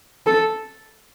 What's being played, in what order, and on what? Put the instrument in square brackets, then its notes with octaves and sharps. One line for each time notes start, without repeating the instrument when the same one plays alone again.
[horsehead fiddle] A4